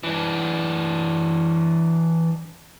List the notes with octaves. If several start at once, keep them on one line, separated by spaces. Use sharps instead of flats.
E3 D4